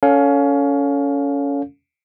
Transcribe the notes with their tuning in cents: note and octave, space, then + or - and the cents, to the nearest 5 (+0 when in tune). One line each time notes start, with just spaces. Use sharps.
C#4 +20 A4 +10 F5 +20